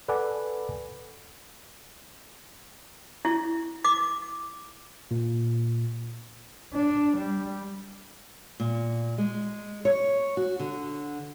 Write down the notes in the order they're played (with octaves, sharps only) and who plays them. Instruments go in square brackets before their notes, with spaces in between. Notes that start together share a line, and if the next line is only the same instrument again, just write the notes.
[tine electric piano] A4 B4 D5 F#5 G#5 D6
[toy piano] E4
D6
[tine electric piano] A#2
[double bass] D4
G3
[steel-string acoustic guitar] A#2
G#3
C#5
F#4
D3